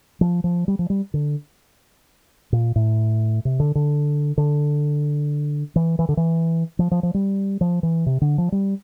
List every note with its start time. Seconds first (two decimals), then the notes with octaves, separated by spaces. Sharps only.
0.21 F3
0.44 F3
0.68 G3
0.79 F3
0.90 G3
1.14 D3
2.52 A#2
2.76 A2
3.45 C3
3.60 D3
3.75 D3
4.37 D3
5.76 E3
5.99 E3
6.09 D3
6.17 E3
6.79 F3
6.91 F3
7.03 F3
7.14 G3
7.61 F3
7.83 E3
8.06 C3
8.21 D3
8.38 F3
8.52 G3